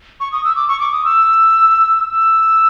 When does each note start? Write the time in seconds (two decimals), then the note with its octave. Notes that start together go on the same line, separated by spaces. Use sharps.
0.20 C#6
0.32 D#6
0.45 E6
0.56 D6
0.68 C#6
0.80 D6
0.92 D#6
1.05 E6
2.13 E6